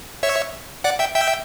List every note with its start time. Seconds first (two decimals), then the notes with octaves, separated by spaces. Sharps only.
0.23 C#5 E5
0.84 D5 F#5
0.99 E5 G5
1.15 E5 G5